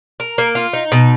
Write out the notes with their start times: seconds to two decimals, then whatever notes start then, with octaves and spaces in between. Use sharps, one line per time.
0.20 A#4
0.38 A#3
0.55 F4
0.73 D#4
0.92 B2